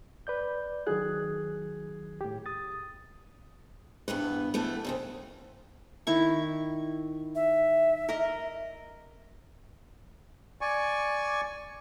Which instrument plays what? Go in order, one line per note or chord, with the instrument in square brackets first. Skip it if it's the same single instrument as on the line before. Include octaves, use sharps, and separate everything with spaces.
[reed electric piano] B4 D5 G6
[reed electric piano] D#3 F#3 F#6 [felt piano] G#4
[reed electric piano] A2 G4
D#6 A6
[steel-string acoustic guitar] E2 G2 B3 B4
E3 A3 B3
F2 C#3 C4
[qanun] D#3 E4 C#6
[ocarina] E5
[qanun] A#4 D#5
[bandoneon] D5 G#5 C#6